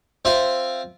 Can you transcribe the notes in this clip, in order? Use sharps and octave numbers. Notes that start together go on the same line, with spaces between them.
C4 F4 E5